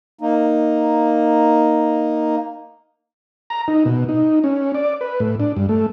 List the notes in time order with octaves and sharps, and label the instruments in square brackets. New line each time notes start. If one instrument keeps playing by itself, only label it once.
[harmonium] A#3 D#4
[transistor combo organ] A#5
D#4
B2
D#4
C#4
D5
B4
A2
D4
G2
A3